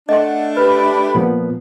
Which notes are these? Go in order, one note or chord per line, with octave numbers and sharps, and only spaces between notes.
A3 D4 D#5 E5 F#5 C6
G4 B4 B5
A#2 F3 B3